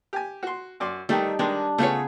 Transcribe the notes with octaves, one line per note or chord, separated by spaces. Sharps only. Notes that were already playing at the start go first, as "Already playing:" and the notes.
G4 G#5
F#4 C6
F#2 D5 C6
D#3 G3 A3 D#4 A4
D#3 G#3 D4
C#3 A3 B3 F4 G#4 C#5